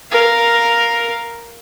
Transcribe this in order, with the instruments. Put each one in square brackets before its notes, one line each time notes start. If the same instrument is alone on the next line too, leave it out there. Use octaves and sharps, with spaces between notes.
[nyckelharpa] A#4 F5